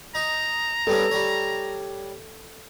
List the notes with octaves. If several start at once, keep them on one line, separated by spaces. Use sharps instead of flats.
D#4 A#5
G2 B3 C#4 A4
G3 C#5